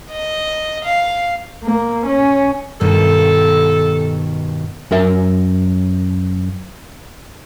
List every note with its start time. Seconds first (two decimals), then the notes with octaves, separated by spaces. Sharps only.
0.11 D#5
0.84 F5
1.63 A#3
2.06 C#4
2.81 G2 B2 D#3 A4
4.91 F#2 A#4 E5